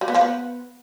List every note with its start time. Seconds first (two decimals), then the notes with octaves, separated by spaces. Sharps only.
0.01 G3
0.08 B3
0.14 F3
0.21 B3